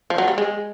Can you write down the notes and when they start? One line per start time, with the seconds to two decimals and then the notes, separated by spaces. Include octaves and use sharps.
0.10 F3
0.18 F#3
0.28 G3
0.38 G#3